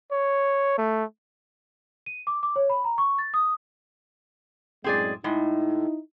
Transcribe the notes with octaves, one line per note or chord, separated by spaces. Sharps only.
C#5
A3
D#7
D6
D6
C#5
B5
A#5
C#6
A6
D#6
F#2 A2 G#3 C4 G#4 D5
A2 G#3 D#4 E4